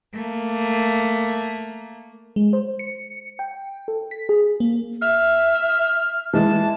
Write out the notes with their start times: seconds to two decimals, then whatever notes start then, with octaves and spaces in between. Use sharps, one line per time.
0.13 A3 A#3
2.36 G#3
2.53 C5
2.79 C#7
3.39 G5
3.88 A4
4.11 B6
4.29 G#4
4.60 A#3
5.01 E5 F6
6.33 E3 G#3 A5